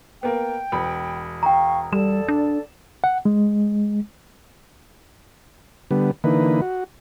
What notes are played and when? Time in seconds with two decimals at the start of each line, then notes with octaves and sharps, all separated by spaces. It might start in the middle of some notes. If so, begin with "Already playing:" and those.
0.23 A#3 B3 G5
0.72 E1 B5
1.43 F5 G5 A#5 C#6
1.93 G3 A4 D5 E7
2.28 D4
3.04 F#5
3.25 G#3
5.91 D3 G3 B3
6.24 D3 E3 A#3 D#4 B4
6.62 F#4